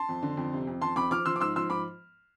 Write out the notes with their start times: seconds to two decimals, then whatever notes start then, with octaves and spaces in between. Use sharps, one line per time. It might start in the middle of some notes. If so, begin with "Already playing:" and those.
Already playing: A5 C6
0.09 F2
0.23 D3
0.37 F2
0.53 C3
0.67 F2
0.81 F2 A5 C6
0.96 F2 B5 D6
1.11 F3 D6 F6
1.25 F3 C6 E6
1.36 D6
1.40 G#2 C6 E6
1.56 F3 C6 E6
1.70 G#2 B5 D6